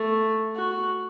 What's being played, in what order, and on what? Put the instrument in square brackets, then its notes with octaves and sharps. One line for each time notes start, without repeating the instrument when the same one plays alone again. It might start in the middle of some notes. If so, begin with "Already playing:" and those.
Already playing: [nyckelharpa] A3
F#4